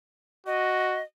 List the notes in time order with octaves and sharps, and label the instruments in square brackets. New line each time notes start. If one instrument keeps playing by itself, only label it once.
[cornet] F#4 [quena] D#5